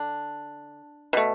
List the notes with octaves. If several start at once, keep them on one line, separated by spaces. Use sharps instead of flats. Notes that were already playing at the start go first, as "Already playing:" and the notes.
Already playing: D3 D4
B2 A3